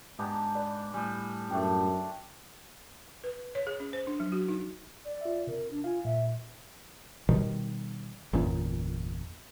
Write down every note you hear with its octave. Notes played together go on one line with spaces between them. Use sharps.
G#2 B3 D4 G4
B4 D5
A2 G3 G#5
F#2 A3 D4 G5 C6
B4
C#5
G#4
C#4
C5
D4
F#3
F#4
D#4
D5
F4 E5
C3 A#4
D4
F4 F5 G#5
A#2 E5
B2 D#3 G3
G1 E2 A#2 C#4